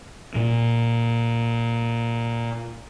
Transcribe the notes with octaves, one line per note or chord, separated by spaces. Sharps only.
A#2 A#3